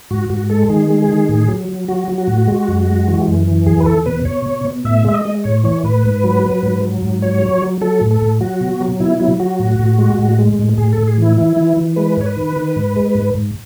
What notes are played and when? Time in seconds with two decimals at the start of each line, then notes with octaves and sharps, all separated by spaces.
0.11 G#2 F#4
0.30 G#2 F#4
0.50 G#3 A4
0.69 D#3 G#4
0.90 G#3
1.09 D#3
1.29 A2
1.48 F#3
1.69 F#3
1.88 F#3 F#4
2.08 F#3
2.18 F#4
2.27 A2
2.47 G#3
2.68 F#2
2.87 G#3
3.08 E3
3.28 F#2
3.47 E3
3.66 E2 G#4
3.80 B4
3.86 E2 A4
4.06 B2 B4
4.25 B2 C#5
4.46 B2
4.65 B2
4.85 A2 E5
5.05 G#3 E5
5.14 D#5
5.25 G#3
5.44 A2 C#5
5.64 E3 C#5
5.83 A2 B4
6.04 G#2
6.24 F#3
6.43 F#3
6.63 G#2
6.82 F#3
7.02 G#2
7.22 F#3 C#5
7.43 F#3
7.62 F#3
7.81 F#3 A4
8.01 A2
8.11 A4
8.22 A2
8.41 F#3 F#4
8.61 B2
8.81 F#3
9.00 B2 E4
9.20 F#3 E4
9.40 F#3 F#4
9.59 A2
9.79 A2
9.98 G#3
10.19 A2
10.39 G#3
10.59 A2
10.78 A2 G#4
10.93 A4
10.98 A2
11.07 G#4
11.18 E3 E4
11.37 E3 E4
11.57 E3
11.77 E3
11.96 G#3 B4
12.17 G#2 C#5
12.26 B4
12.37 D#3
12.56 D#3
12.76 G#2
12.96 G#3
13.15 G#2
13.35 G#2